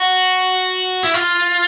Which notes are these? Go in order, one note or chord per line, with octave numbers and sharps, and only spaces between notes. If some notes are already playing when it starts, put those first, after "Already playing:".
Already playing: F#4
E4
F4